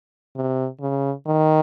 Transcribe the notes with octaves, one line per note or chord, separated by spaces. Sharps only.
C3
C#3
D#3